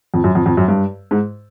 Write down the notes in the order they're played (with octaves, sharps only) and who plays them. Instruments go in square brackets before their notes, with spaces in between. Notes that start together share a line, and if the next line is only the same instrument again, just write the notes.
[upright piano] F2
F#2
F2
F2
F#2
G2
G#2